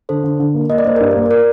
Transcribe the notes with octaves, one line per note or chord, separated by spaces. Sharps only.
D3 A4 C5
D3
D3
A#3
A#3 D#5
D5
A#3 C5
G2 A#4 D5
A#3
A#4 D5